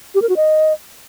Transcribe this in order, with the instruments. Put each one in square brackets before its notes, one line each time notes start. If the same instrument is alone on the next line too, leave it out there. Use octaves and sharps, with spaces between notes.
[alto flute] G4
A#4
F#4
D#5